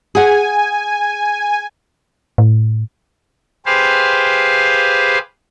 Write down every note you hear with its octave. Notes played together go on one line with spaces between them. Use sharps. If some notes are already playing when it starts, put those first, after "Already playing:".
G#4 F#5 G#5
A2
G4 G#4 B4 C5 F5